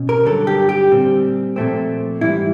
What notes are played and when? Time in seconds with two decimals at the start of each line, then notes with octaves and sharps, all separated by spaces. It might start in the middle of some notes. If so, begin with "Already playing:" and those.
Already playing: B2 C#4
0.09 A#4
0.25 G2 D3 F#3 A4
0.47 G4
0.69 G4
0.91 A#2 G3 C4
1.56 A#2 F3 A3 C4
2.21 G#2 E3 G3 E4